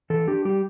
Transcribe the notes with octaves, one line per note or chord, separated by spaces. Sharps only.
E3 A4
D4 G4
G3 G4